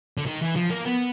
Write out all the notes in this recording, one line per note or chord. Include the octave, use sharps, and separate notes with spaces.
D3
D#3
E3
F3
A#3
B3